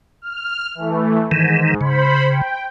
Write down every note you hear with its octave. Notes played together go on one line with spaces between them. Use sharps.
F6
E3 A3
G#2 D#3 E3
C#3 C5 B5
G5